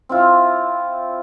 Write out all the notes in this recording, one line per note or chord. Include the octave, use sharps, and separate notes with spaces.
C4 E4 F4